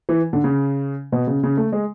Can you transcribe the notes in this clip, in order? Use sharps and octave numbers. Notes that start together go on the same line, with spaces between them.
E3
D3
C#3
B2
C#3
C#3
A3
G#3